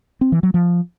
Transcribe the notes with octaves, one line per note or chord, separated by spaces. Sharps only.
C4
E3
F#3
F3